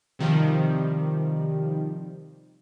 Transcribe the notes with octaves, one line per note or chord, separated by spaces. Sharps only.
C3 D#3 F3 G3